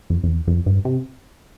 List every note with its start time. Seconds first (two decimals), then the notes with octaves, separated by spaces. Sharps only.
0.10 F2
0.23 F2
0.28 E2
0.47 F2
0.66 G2
0.85 C3